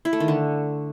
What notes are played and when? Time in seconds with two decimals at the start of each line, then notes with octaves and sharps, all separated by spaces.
0.05 E4
0.13 A3
0.20 D#3
0.28 D3